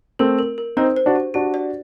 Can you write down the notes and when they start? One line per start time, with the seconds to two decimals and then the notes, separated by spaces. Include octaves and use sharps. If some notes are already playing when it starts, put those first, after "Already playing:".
0.19 A3 C4 A#4
0.39 A#4
0.58 A#4
0.77 C4 D#4 C5
0.96 C5
1.06 D4 F#4
1.15 G4
1.34 D4 F#4 G4
1.54 D5